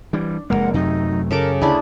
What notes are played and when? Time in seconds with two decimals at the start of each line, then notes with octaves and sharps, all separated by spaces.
0.13 E3 G3 D4
0.50 F1 F#2 G#3 A#3 A#4 F#5 A#5
0.74 F#2 C3 F#3 A3 D#4
1.31 C#3 A4 A#4 D6
1.61 D2 D4 E4 G#4 B5